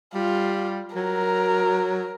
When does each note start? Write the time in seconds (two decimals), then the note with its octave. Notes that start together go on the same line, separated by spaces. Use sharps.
0.14 G3 F4
0.96 F#3 A#4